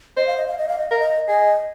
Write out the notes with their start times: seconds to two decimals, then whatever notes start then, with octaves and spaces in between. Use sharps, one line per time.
0.17 C5 D#5
0.27 F5
0.37 D#5
0.47 F5
0.58 D#5
0.69 F5
0.79 D#5
0.90 A#4 F5
1.00 D#5
1.28 G#4 D#5